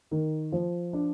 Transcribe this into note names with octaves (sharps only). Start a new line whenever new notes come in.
D#3
F3
D4